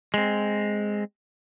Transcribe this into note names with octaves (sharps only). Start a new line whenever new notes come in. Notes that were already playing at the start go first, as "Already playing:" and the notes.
G#3 C4